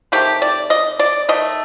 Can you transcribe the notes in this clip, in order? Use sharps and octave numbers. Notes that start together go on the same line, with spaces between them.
C3 D#3 A3 G4
D5
D#5
D5
D#3 A3 D#5